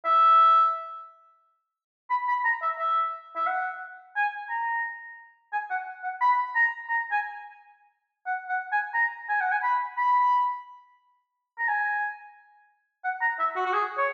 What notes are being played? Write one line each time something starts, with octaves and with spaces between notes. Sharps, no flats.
E5
B5
B5
A#5
E5
E5
E5
F#5
G#5
A#5
G#5
F#5
F#5
B5
A#5
A#5
G#5
F#5
F#5
G#5
A#5
G#5
F#5
G#5
B5
B5
A#5
G#5
F#5
A#5
E5
F#4
F#4
G#4
C#5